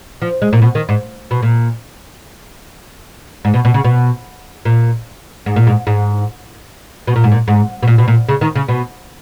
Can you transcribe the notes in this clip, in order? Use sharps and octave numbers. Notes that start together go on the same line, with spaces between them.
F3
G#3
A#2
B2
D#3
G#2
B2
A#2
G#2
B2
B2
C#3
B2
A#2
G#2
A#2
G#2
G#2
B2
A#2
G#2
A#2
G#2
B2
A#2
B2
A#2
C#3
D#3
C#3
B2